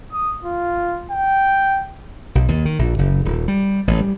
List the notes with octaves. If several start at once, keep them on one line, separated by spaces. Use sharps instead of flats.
D#6
F4
G5
B1
D#2
D#3
A#1
F#1
D#1
G3
A1
G3